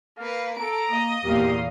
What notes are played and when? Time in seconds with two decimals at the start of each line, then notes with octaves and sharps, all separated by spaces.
0.18 A#3 B4 F5
0.58 A4 A#5 D7
0.90 A#3 D#5
1.25 E2 A#2 G4 A#4 F5